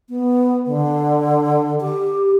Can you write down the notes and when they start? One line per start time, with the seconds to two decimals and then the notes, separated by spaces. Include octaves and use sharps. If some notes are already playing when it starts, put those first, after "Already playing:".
0.09 B3
0.67 D3
1.80 G4